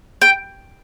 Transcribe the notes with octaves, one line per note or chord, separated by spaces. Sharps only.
G5